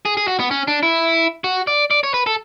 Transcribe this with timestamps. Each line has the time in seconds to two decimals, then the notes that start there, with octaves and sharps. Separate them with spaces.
0.05 G#4
0.17 G#4
0.28 F#4
0.39 B3
0.51 C#4
0.68 D4
0.83 E4
1.44 F#4
1.67 D5
1.91 D5
2.03 C#5
2.14 B4
2.26 A4